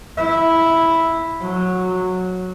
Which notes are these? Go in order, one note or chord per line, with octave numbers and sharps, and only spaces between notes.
E4
F#3